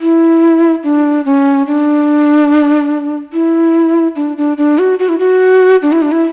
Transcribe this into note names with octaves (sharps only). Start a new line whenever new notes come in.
E4
D4
C#4
D4
E4
D4
D4
D4
F#4
F#4
E4
F#4
D4
E4
D4
E4